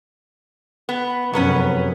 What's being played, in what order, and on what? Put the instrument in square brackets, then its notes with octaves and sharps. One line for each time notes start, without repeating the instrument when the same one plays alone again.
[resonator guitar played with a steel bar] B3
[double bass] F1 F#2 [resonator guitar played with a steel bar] F#3 B3 C#4